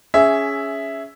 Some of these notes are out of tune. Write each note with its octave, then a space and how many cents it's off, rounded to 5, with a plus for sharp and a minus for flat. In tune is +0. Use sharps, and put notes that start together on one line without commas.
C#4 +15 G#4 +0 E5 +0